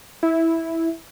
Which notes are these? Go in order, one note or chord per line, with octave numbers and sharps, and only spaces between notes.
E4